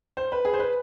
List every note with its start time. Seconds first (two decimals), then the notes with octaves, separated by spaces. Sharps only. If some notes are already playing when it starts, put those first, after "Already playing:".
0.17 C5
0.32 B4
0.45 G#4
0.54 C5
0.60 B4